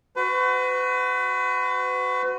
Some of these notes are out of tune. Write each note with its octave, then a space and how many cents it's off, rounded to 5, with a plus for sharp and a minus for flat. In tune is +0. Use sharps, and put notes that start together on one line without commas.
F#4 +0 B4 +40